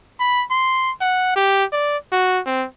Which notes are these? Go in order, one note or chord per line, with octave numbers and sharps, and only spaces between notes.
B5
C6
F#5
G4
D5
F#4
C4